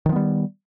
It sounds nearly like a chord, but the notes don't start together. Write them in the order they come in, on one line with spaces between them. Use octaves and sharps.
D#3 F3 B3 G3